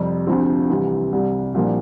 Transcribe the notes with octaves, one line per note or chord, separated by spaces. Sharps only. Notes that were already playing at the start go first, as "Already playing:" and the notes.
Already playing: F2 C3 G3
D2 C3 F3 C4
C2 C3 E3
C2 C3 G3
C2 A#2 F3 A#3 D4